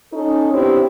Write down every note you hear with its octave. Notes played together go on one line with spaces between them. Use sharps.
C#4 D#4 A4
A2 B3 C4 D4 E4 G4